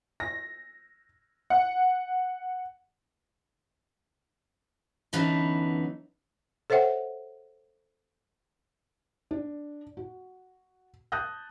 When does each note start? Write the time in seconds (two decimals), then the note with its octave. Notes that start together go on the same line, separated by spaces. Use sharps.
0.20 A#6
1.50 F#5
5.13 F#2 D3 E3 B3 D#4 A5
6.70 A4 C5 C#5 E5 F#5 G5
9.31 D4
9.97 F#4
11.12 A5 D#6 F#6 G6 A#6